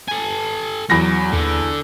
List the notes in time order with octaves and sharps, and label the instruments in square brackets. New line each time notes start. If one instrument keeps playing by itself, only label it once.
[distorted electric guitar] A4 G#5
[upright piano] E2 B5 A#6 [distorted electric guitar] F#3
[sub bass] D#2 [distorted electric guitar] D3